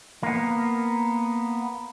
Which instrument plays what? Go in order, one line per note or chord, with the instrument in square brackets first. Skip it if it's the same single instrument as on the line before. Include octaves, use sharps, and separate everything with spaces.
[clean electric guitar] A#3 B3